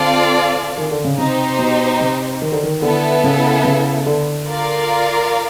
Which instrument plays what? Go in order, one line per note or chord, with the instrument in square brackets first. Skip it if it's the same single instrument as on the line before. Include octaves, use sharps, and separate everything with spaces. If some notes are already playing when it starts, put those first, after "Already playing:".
Already playing: [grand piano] D3 [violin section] C4 F4 A4 D5 F5
[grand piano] D#3
D3
C#3
[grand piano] C3 [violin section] D#4 G4 C5
[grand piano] B2
C3
D#3
D3
D#3
[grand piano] D3 [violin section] B3 E4 A4
[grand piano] C#3
C#3
D3
[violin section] F4 A#4 D5 F5